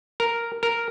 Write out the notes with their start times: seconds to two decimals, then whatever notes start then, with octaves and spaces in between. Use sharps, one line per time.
0.20 A#4
0.63 A#4